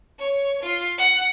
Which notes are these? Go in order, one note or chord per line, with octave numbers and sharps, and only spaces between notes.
C#5
F4
F#5